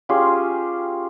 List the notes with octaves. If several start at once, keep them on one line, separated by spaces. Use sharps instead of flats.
C#4 F4 G4 G#4